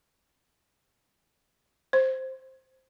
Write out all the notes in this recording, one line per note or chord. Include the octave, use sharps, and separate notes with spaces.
C5